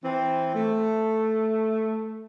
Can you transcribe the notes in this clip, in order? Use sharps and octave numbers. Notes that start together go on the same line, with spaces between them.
E3 C4
A3